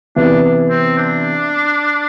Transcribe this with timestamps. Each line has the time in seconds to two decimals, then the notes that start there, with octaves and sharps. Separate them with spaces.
0.16 C3 E3 B3 D4 E4
0.70 C4
0.98 D4